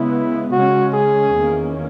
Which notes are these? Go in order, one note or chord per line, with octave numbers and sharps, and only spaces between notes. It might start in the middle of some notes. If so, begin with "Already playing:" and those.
Already playing: C#3 G#3 B3 E4
C#3 G#3 C#4 F#4
G#4
E2 D#3 A#3 C#4